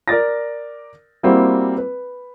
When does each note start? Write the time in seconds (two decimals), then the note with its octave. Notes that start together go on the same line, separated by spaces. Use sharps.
0.08 A#4 D5 A6 A#6
1.23 G3 A#3 C4 E4 F#4
1.78 B4